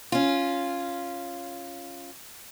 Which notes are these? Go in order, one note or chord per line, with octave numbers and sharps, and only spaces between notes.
C#4 F4